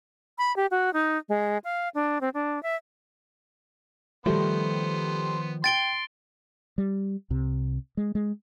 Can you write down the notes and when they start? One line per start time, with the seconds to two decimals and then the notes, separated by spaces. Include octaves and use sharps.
0.38 B5
0.56 G4
0.71 F#4
0.93 D#4
1.29 G#3
1.64 F5
1.95 D4
2.21 C4
2.34 D4
2.63 E5
4.26 D#3 F3 G3 A3 B3 C5
5.64 G5 C6 A6 D7 G7
6.78 G3
7.30 C2 C3
7.97 G#3
8.15 G#3